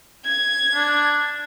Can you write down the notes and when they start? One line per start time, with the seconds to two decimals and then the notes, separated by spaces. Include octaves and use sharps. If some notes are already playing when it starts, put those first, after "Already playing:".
0.25 G#6
0.74 D4